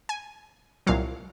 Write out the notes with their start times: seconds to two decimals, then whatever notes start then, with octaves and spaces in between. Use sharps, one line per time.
0.09 G#5
0.87 C2 A#2 F#3 F5